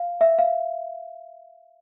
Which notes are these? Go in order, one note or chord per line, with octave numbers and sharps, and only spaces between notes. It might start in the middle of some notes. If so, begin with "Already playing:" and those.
Already playing: F5
E5
F5